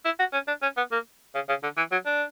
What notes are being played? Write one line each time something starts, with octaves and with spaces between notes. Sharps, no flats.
E4
F#4
C#4
D4
C#4
B3
A#3
C#3
C#3
D3
E3
F#3
D4